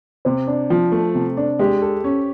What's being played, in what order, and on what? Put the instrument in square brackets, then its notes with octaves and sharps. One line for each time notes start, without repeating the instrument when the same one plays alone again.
[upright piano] C3 [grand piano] C5
[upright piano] D4
F3
A3
C3
D4
[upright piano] G#3 [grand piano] G4
[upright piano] A4
C#4